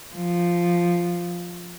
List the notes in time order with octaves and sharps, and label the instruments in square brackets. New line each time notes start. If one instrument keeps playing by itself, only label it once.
[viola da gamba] F3